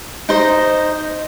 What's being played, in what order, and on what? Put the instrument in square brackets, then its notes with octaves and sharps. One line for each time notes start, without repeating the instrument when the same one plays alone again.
[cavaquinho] D#4 C5 D#5